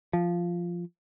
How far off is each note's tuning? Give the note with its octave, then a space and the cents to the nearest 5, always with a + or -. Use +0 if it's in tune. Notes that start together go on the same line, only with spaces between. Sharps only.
F3 -5